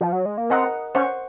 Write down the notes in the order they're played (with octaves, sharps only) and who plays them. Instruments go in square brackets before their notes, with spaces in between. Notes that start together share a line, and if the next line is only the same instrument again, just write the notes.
[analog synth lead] F3
F#3
G#3
A#3
[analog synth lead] C4 [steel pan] A#4 D#5 F#5 A#5
[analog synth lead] C#4 [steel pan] C5 F#5 C#6